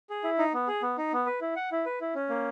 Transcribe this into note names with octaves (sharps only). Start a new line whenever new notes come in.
G#4
E4
D#4
B3
G#4
B3
D#4
B3
B4
E4
F#5
E4
B4
E4
C#4
A#3